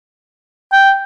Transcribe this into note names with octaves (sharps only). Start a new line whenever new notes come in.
G5